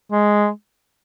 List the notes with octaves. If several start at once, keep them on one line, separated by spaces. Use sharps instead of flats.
G#3